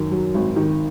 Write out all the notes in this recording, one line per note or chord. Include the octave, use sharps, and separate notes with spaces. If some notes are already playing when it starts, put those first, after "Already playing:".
Already playing: F#2 D#3
F#3
G#1
D#3